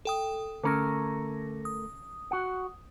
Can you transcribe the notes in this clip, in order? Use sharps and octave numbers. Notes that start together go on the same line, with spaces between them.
A4 G5 D#6
D3 A3 C#4 A#4 A#6
D#6
F#4 F#5